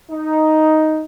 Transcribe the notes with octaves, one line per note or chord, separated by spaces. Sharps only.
D#4